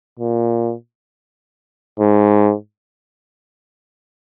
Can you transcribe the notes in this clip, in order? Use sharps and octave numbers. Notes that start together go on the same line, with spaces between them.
A#2
G#2